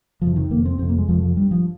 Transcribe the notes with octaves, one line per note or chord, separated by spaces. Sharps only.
F2 C3 F3
D#3
F2 C3 A#3
C4
F2 C3 C4
A#3
G#3
F2 C3 F3
F3
G2 G3
F3